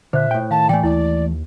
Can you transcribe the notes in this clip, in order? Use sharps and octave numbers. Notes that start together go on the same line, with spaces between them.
A#2 D3 C5 E5 F#6
A2 G5
D#3 F5 A5
A2 E3 A3 D5 G5 G#5
D#2 E4 D5